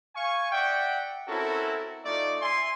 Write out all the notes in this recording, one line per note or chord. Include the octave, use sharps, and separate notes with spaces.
F5 G#5 C#6
D5 E5 F#5 G5
C4 C#4 E4 F#4 A4 A#4
A3 D#4 F4 A4 D5
E5 G#5 C6